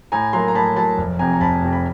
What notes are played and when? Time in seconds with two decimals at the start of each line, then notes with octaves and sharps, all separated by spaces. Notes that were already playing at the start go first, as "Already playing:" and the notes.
0.12 A2 G#5 A#5
0.33 F#3 A#3 A#5 C6
0.48 A#5
0.55 A2 A5 B5
0.76 F#3 A#3 A5 B5
0.98 F1
1.19 F2 C3 G#5 A#5
1.33 A#5
1.41 F1 A5 B5
1.62 F2 C3
1.73 B5